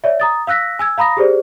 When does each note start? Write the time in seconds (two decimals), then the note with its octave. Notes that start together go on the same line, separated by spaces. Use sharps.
0.04 C#5 D5 E5
0.20 A#5 D#6 A6
0.47 F5 E6 F#6 A#6 B6
0.79 G#5 E6 G#6
0.98 F5 A#5 B5 D#6 A#6
1.17 G4 G#4 C5 D5